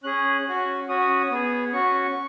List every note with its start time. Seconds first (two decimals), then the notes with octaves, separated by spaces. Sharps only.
0.03 C#4 G#4 F#6
0.46 C#4 F#4
0.88 C#4 F#4 D#6
1.31 B3 G#4
1.73 C#4 F#4 C#6